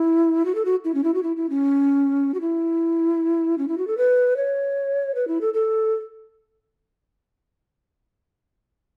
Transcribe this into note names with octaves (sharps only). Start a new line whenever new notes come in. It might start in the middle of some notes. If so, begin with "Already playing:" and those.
Already playing: E4
F#4
A4
F#4
E4
C#4
E4
F#4
E4
E4
C#4
F#4
E4
C#4
E4
F#4
A4
B4
C#5
B4
E4
A4
A4